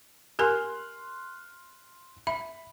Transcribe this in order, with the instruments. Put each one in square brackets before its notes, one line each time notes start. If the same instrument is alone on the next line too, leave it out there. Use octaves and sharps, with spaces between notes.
[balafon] G4 A#4 G#5 [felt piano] C6 F6 F#6
[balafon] E5 [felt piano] B5